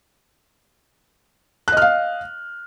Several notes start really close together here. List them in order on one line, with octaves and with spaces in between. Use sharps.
F#6 D#5 F6 F5